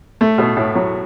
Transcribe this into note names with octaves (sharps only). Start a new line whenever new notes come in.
A3
B2
A2
F#3